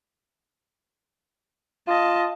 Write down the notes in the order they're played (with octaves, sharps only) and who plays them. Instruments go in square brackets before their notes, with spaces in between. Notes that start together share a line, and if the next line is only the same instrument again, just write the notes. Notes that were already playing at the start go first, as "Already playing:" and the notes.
[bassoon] F4 [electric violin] D#5 A5